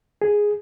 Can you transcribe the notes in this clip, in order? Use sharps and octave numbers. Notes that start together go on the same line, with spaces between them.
G#4